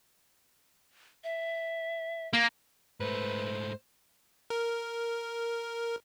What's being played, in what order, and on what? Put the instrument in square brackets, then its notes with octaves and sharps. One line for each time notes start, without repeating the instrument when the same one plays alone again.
[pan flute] E5
[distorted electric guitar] A#3
[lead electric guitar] G#2 A3 [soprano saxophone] B4 [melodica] C5
[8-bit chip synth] A#4